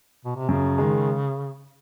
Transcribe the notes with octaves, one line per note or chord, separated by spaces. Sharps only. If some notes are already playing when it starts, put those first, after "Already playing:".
B2
C3
F#2 C#3
D#3 G#3